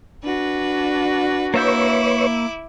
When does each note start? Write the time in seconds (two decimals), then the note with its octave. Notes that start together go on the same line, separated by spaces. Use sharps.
0.24 D4 F#4 B4
1.54 A#3 E4 B4 C#5 E5 C#6 D6 G6